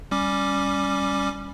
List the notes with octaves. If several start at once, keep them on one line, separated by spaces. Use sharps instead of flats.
G3 C#4 D6